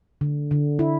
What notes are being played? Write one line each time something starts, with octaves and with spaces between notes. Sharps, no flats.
D3
D3
E4